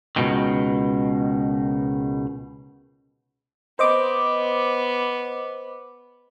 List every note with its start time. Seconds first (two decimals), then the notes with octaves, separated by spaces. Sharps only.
0.16 C#2 B2 D#3
3.79 B3 C5 D#5 D6